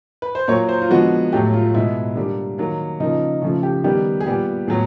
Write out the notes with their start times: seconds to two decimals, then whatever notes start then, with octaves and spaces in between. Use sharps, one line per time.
0.22 B4
0.35 C5
0.48 A#2 F#3 A#3 C#5
0.69 C5
0.82 F4
0.90 D3 F3 G#3 B3 F#4
1.32 A2 F#3 A3 G4
1.54 F4
1.74 B2 G#3 B3 E4
2.16 D3 G3 A#3
2.58 D#3 F#3 A#3
3.00 C#3 F3 A#3 D#4
3.42 C#3 F3 A3 C#4
3.63 G4
3.84 D#3 G3 B3 G4
4.20 G#4
4.26 A#2 G3 B3 G4
4.68 A2 F#3 B3 G#4